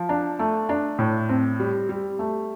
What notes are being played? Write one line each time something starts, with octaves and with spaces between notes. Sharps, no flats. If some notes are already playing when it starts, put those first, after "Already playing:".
Already playing: F3
D4
A3
D4
A2
C4
G3
G3
A3